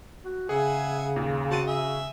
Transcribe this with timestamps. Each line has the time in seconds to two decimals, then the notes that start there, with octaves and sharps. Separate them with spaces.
0.25 F#4
0.49 C#3 G#4 E5 F#5 G#5
1.16 D#2 A#2
1.51 C4 F#4 F#5 A5 D#7
1.67 G#4 E5